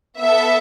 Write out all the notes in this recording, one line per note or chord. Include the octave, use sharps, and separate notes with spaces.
B3 A4 E5